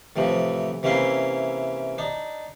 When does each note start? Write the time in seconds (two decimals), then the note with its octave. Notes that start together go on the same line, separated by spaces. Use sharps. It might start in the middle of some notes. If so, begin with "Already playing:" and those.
0.16 A2 C3 E3 F3
0.83 C3 E3 A#3 C#4 E4 C6
1.98 D4 D#4